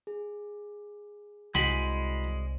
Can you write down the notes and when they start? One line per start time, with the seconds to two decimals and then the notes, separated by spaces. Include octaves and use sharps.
0.07 G#4
1.55 C2 G#3 E4 F#4 B5